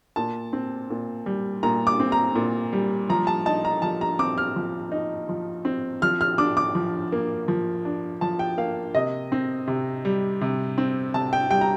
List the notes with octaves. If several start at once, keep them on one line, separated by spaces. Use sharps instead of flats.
A#2 A5
C4
A#2
G3
A#2 A#5
D6
C4
A#5
A#2
G3
F3 A#5
A5
D#4 A5
A#5
F3 A5
A#5
C4 D6
F6
F3
D#4
F3
C4
F3 F6
F6
D4 D6
D6
F3
A#3
F3
D4
F3 A5
G5
A#3 F5
C3 D#5
C4
C3
G3
C3
C4
C3 A5
G5
G3 G5
A#5